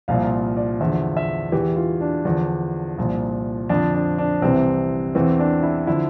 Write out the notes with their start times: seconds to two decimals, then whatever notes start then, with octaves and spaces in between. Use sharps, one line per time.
0.08 C2 A#2 F3 F5
0.57 D5
0.80 E2 D3 F3 E5
1.17 E5
1.52 E2 E3 G4
1.76 F4
2.01 D4
2.25 E2 D3 F3
2.98 C2 A#2 F3
3.69 F2 D3 F3 D4
3.95 D4
4.18 D4
4.42 C2 C3 E3 C4
5.15 E2 E3 C4
5.39 D4
5.63 E4
5.87 D3 F3 E4